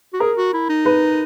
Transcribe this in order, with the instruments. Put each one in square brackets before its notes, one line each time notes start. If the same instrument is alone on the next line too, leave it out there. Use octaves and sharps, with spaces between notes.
[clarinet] F#4
[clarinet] G#4 [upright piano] A#4
[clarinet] F#4
E4
D#4
[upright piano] B4